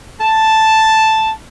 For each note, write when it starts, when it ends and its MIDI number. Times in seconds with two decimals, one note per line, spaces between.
0.21 1.32 81